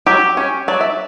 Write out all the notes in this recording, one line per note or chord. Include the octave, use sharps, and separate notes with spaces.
F#3 G4
C#4
F#3 D5
E5